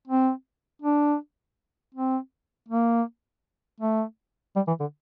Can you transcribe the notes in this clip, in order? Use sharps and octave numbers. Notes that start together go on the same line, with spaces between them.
C4
D4
C4
A#3
A3
G3
E3
D3